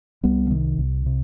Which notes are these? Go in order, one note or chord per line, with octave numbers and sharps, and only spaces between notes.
C2 G3 B3
F3
C3 D#3
C2
C3